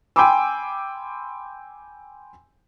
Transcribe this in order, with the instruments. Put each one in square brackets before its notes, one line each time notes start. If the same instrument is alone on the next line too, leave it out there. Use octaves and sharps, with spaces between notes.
[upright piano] G5 G#5 B5 C6 D6 E6